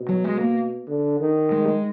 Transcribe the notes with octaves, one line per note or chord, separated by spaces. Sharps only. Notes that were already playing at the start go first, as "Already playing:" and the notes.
Already playing: B2
F#3
G#3
A#3
D3
D#3
G#3
G#3